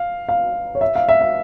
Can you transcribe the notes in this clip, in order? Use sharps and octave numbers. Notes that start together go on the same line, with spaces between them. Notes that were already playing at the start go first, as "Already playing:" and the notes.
Already playing: F5
F5
C#5
E5
F5
E5
F5